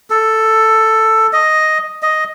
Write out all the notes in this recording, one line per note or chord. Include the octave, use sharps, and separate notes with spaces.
A4
D#5
D#5